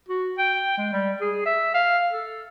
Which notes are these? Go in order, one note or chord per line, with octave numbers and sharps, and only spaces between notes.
F#4
G5
G#3
G3
G#4
E5
F5
A4